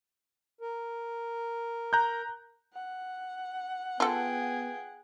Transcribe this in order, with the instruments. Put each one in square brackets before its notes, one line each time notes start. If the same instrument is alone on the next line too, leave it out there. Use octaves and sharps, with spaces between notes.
[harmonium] A#4
[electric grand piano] A#5 F#6 G6
[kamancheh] F#5
[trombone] B3 [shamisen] F4 A4 [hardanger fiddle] G#4 G5